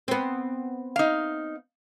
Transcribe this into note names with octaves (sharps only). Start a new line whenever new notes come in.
B3 C4
D#4 F5